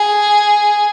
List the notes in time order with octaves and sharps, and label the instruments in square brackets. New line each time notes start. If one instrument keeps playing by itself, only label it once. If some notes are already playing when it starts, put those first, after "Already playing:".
Already playing: [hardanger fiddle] G#4